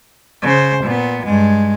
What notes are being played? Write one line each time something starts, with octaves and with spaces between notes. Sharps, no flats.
C#3 C5
A#2 B3
G2 G#3